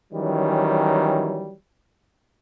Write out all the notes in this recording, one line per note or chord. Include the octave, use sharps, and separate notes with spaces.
D#3 E3 F#3 G3 C#4